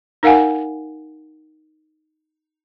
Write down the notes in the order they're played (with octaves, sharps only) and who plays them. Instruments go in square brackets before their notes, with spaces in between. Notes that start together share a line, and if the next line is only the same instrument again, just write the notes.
[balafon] D#4 A#4 F5 F#5 G#5